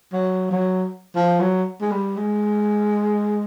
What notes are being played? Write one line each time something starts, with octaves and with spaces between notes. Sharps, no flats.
F#3
F#3
F3
F#3
G#3
G3
G#3